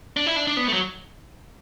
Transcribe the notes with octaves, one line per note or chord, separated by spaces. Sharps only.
D4
E4
D4
D4
B3
A3
F#3